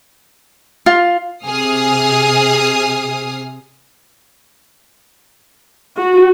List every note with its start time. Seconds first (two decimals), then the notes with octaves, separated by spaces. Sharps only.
0.86 F4
1.46 C3 G#4 D#6 F6 C7
5.96 F#4